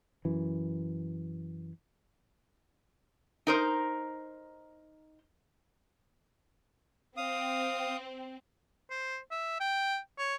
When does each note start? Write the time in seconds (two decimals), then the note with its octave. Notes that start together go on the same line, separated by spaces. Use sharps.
0.25 F#2 E3
3.47 D#4 A#4 C5
7.17 C4 F5 D#6
8.90 C5
9.31 E5
9.60 G5
10.18 C#5